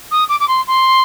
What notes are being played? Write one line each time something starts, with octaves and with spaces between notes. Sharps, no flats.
D#6
D6
D6
C6
C6